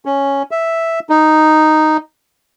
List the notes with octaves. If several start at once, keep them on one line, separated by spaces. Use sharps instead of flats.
C#4
E5
D#4